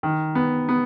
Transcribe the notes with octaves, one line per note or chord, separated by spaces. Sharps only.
D#3
B3
B3